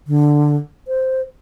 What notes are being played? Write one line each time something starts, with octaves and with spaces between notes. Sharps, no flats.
D3
C5